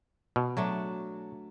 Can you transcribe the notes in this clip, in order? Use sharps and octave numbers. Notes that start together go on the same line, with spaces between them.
B2
F#3 A3 D4